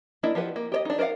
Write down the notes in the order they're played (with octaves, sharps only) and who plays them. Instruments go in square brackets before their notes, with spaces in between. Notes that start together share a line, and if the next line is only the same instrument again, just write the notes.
[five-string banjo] A#3 D4 E4 D#5
F3 G4 B4 F#5
A#3
G4 C#5 D#5
D4 D#4
A#4 C5 D5 F5 F#5